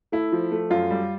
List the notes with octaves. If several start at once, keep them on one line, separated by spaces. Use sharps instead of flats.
A3 E4
F3
A3
F#2 F4
G3